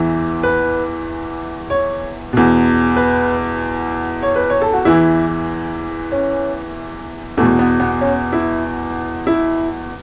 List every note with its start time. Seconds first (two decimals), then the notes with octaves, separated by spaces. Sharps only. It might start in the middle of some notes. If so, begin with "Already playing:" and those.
Already playing: E2 E3
0.43 B4
1.70 C#5
2.33 E2 B2
2.96 B4
4.22 C#5
4.36 B4
4.50 C#5
4.62 A4
4.73 F#4
4.85 E2 E3 E4
6.12 C#4
7.37 E2 A3
7.41 B2
7.59 B3
7.80 B3
8.01 C#4
8.33 E4
9.27 E4